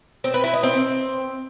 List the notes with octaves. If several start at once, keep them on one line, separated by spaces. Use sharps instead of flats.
C4
B4
E4
D#5
C4